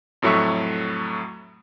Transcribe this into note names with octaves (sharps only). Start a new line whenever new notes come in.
F2 A2 F#3 A3 E5 C#6